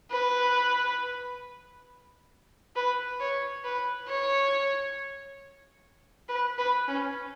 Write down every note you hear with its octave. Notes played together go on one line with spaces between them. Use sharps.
B4
B4
C#5
B4
C#5
B4
B4
C#4